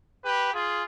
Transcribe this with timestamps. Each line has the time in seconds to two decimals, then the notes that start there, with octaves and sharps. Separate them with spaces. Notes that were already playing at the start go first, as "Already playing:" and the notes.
0.24 G4 B4
0.52 F4 G#4